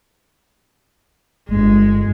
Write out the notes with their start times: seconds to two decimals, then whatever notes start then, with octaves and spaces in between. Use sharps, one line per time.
1.49 G1 G#3